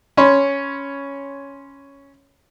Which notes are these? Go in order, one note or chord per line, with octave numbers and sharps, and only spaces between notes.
C#4 C#5 B5 C6